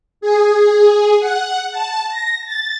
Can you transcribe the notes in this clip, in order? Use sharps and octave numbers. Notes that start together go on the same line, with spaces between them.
G#4
G#4
F#5
A5
A#6
A6